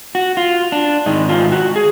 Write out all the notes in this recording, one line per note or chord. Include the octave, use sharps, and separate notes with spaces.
F#4
F4
D4
G#2 D#3 D#4
F4
F#4
G#4